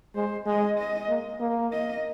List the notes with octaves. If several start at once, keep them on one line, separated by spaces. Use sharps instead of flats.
G#3 C5
G#3 D#5
D#5
A#3
A#3
D#5